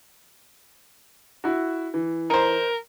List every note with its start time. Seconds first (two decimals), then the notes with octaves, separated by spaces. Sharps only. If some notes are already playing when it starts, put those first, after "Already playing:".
1.44 E4 F#4
1.94 E3
2.30 D#4 A#4 C5